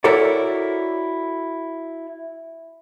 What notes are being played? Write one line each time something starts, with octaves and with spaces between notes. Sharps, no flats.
E4 F#4 A4 A#4 C#5 D5